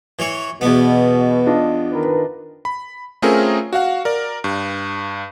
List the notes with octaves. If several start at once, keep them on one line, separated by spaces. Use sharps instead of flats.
E3 C#5
E2 B2 B3
D4 F4 D#5
D#3 A#4 B4
B5
A3 C4 C#4 F4 G#4 A#4
F#4 F5 F#5
A#4 D5
G2